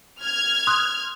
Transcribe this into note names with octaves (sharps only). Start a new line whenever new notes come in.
F6 G#6
C6 D#6 F#6